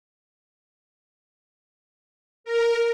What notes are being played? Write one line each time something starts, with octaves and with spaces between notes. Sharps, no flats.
A#4